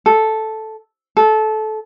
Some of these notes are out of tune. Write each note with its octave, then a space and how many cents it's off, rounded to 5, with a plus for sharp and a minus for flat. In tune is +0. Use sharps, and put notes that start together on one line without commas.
A4 -5
A4 -20